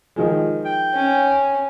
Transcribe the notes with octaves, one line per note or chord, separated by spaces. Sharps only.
D#3 F3 G#3
G5
C#4